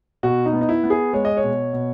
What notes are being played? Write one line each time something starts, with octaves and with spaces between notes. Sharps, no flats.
B2 F#4
D#4
B3
D#4
E4
B3
G#4
G#3 C#5
D#5
C#5
B2
B2